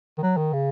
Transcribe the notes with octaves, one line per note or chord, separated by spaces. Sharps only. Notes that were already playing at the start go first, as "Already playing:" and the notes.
D#3
F#3
D#3
C#3